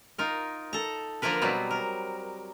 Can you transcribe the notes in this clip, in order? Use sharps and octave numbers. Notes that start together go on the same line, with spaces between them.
D#4 F4 A#4
A4 A#5
D3 F3 A#3 F4 A#4 B4
B2 F#3 G3 B3 C4
A#4